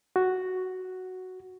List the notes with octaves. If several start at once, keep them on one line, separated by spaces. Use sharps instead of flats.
F#4